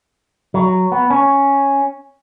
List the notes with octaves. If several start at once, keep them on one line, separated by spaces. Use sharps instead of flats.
F#3
B3
C#4